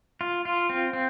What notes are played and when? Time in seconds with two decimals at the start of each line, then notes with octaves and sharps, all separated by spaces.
0.21 F4
0.45 F4
0.70 C4
0.93 C4